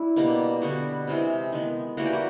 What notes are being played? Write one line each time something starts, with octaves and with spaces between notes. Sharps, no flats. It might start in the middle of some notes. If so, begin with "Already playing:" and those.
Already playing: D4 E4
B2 G3 A#3
D3 G3 B3 F#4
C3 E3 G#3
D#3 G#3 B3
E3 G3 A#3 F#4
G4
F#4